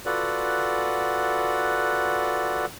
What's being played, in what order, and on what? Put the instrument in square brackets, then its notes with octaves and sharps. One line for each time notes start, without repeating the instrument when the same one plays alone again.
[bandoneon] F4 F#4 A4 B4 D5 F#5